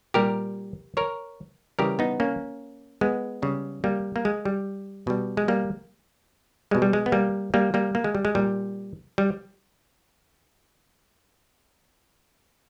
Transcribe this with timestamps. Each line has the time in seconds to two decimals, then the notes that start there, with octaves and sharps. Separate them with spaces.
0.14 A#2 G3 G4 A#4
0.97 A#4 C#5
1.79 C#3 E3 G3 G4 A#4
1.99 B3 D#4
2.20 A#3 C#4
3.01 G#3 B3
3.42 C#3 G3
3.84 G3 A#3
4.16 A#3
4.25 G#3
4.45 G3
5.07 B2 G3
5.37 G#3
5.48 G3 A#3
6.71 G3 G#3
6.75 B2
6.82 G3
6.93 G#3
7.06 B3
7.12 G3 A#3
7.54 G3 A#3
7.74 G3 A#3
7.95 A#3
8.04 G#3
8.15 G3
8.25 G#3
8.35 A#2 G3
9.18 G3